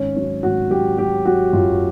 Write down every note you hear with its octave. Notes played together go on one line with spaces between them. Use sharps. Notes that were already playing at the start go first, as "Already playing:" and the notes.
Already playing: G#1 C#4
F#3 C#4
G#1 F#4
F#3 G4
F#3 G4
F#3 F#4
F#2 F4